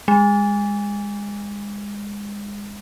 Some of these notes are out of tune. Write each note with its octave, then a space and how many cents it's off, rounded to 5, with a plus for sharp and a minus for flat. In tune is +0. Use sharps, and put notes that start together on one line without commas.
G#3 -25